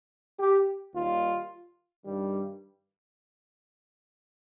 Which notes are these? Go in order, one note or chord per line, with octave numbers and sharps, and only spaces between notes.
G4
D#2 D#3 G3 F4
G2 D#3 G3